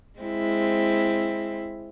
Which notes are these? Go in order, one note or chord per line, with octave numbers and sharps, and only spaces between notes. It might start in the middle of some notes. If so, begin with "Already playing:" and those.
G#3 C4 E4